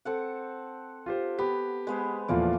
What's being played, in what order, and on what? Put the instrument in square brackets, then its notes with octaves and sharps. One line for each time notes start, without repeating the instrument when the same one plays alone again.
[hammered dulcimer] C4 A4 F#5
[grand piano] F4 G4 C5
[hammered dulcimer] B3 [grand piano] G4
[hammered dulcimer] G#3 B3 C5
[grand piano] E2 A#2 F3 [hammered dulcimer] A3 F4 D5